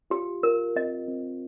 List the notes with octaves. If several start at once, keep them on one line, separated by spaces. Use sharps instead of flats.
F4 G4
F4 A#4
C4 D#5
C4